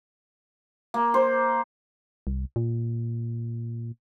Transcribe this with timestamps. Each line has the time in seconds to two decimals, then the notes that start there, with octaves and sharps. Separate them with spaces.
0.94 A#3
1.14 C5
2.27 C2
2.56 A#2